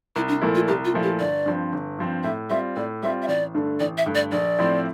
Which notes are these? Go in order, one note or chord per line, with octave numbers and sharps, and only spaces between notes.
C2 E4
D4
A#2 F3 A3 E4
F4
C2 G4
F4
A#2 F3 A3 E4
G4
G1 D5
G2 F3 C4
G1
G2 F3 C4
A2 E5
G3 C4 F4 E5
A2 D5
G3 C4 F4 E5
E5
A1 D5
G2 D3 A3
A1 D5
E5
G2 D3 A3
D5
A#1 D5
A2 F3 C4 E4